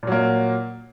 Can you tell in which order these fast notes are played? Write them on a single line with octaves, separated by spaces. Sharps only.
A#2 F#3 A#3